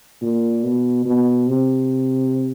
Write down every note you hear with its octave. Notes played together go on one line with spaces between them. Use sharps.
A#2
B2
B2
C3